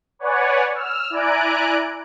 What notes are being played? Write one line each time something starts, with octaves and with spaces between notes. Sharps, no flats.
B4 C#5 D5 F#5 G#5
E6 F6
E4 D5 G#5 A#5 F#6 D7